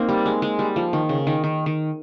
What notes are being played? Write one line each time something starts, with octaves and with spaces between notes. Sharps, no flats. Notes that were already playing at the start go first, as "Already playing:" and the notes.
Already playing: A#3 C4 D#4
G3
G#3
G#3
G3
F3
D#3
C#3
D#3
D#3
D#3